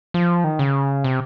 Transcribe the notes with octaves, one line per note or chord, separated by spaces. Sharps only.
F3
D#3
C#3
C3